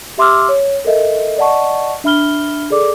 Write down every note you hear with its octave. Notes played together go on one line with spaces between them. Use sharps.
G4 E5 C6 D6 E6 F6
C#5
A4 A#4 D#5 E5
D5 D#5 F#5 A5 C#6
D4 E5 B5 F6 G7
G#4 A4 D5 D6